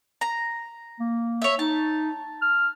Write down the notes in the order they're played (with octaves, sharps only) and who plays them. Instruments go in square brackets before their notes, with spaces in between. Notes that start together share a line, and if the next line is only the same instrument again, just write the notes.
[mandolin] A#5
[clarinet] A#3
[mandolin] C#5 E5
[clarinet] D#4 [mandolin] A5
[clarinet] F6